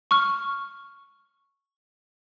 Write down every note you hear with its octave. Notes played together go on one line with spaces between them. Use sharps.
C#6 F6